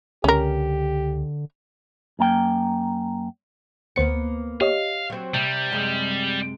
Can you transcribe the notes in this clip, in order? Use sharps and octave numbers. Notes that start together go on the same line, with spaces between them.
C#2 D3 C#4 G4 A#4
F#2 A#3 G5
D2 A#3 B3 C5 C#7
G4 C#5 D#5 F5
F#3 C4
C3 G3
F#2 C3 G#3